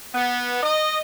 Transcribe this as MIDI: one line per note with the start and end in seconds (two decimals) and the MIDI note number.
0.14 0.59 59
0.62 1.01 75